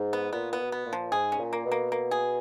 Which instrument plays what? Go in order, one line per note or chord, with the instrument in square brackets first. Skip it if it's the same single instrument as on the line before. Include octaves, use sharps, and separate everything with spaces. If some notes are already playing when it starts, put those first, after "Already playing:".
Already playing: [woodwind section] G#2
[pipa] B3
[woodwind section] A#2 [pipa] B3
[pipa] B3
[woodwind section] B2
[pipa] B3
[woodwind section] A#2
[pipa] F3
[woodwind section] G#2 [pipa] G#4
[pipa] C#4
[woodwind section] A#2
[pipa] A#3
[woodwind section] B2
[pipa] A#3
A#3
G#4